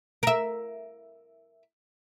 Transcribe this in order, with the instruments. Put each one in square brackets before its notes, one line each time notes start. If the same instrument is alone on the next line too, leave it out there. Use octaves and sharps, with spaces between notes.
[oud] A#4 E5